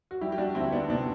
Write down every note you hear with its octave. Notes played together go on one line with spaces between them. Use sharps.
F#4
G3 E4 G4
G4
D4 F#4
D2 C4 E4
B3 D4
C3 B3 D4